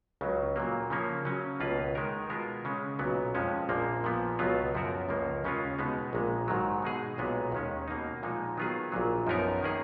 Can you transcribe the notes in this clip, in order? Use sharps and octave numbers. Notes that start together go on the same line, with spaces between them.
C#2 C#3 F#3
A#2 F#3 A#3
C#3 F3 A#3 C#4
C#3 F#3 C#4
C#2 B2 A#3 F4 B4
D#3 G#3 D#4 A#4
B2 G#3 B3 F4 A#4
C#3 G#3 C#4
B1 A#2 F#3 B3
F2 F3 G#3 C#4
A#1 A#2 F3 A#3
A#2 F3 B3
C#2 B2 F#3 B3 F4
F#2 F3 B3 F#4 A#4
C#2 C#3 F3 A#3
D#2 C#3 G#3 C#4 F4
B2 G#3 B3 D#4
A#1 A#2 G#3
G#2 D#3 F#3
B2 G#3 D#4 G#4
B1 A#2 G#3 B3
D#2 D#3 G#3 C#4
B2 A#3 D#4
A#2 F3 G#3 D#4
D#3 F#3 B3 F4 G#4
A#1 A#2 F#3
F#2 F3 B3 D#4 A#4
D#3 A#3 C#4 G#4